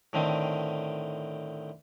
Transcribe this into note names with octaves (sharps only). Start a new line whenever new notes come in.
A2 D3 D#3 C4